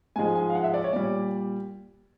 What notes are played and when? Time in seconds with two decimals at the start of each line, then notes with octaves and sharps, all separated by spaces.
0.16 G#2 F3 G#3 G#5
0.35 G#5
0.50 F5
0.55 F#5
0.64 E5
0.74 D5
0.84 C#5
0.93 A#2 G3 D5